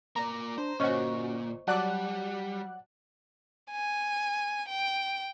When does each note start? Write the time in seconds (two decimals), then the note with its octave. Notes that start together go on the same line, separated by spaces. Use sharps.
0.16 A#3 D5 A#5
0.58 D4 C5
0.80 G1 A#2 C#4 F#4 C5 D#5 C#6
1.68 F#3 G3 D5 F#5 A5 D6 F#6
3.71 G#5
4.68 G5